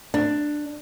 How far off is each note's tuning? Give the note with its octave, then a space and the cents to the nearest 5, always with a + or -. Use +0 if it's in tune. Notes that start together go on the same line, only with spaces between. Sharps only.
D4 +10